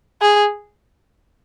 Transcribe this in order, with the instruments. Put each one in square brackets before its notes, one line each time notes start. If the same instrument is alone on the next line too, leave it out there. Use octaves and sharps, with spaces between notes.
[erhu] G#4